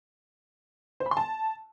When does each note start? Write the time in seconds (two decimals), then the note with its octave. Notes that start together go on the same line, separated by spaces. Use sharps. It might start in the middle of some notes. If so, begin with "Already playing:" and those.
1.00 C5
1.06 B5
1.11 C6
1.17 A5